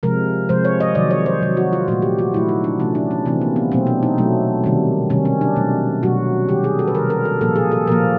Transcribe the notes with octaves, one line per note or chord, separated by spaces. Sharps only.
C3 F3 G#3 A#4
C3 F3 G#3 C5
C#5
D#5
C3 D#3 F#3 D5
C#5
C5
C3 D#3 F#3
F#4
F4
A#2 F#3 A3 F#4
G4
F#4
A#2 F#3 A3 E4
D#4
D4
C3 E3 A3 C#4
D4
C#4
C3 E3 A3 C4
A#3
B3
B2 F#3 A3 C4
D4
D#4
B2 F#3 A3
C3 D#3 G3
C3 D#3 G3 C#4
C#4
D4
B2 F#3 A3
B2 F#3 A3 F#4
C3 D#3 G3 G4
G#4
A4
B4
C3 D#3 G3 A#4
A#4
A4
A#2 F3 A#3 A4
G#4
A4
A#2 F3 A#3 A#4